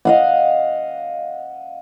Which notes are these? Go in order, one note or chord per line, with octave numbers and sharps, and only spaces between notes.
D#5 F5 F#5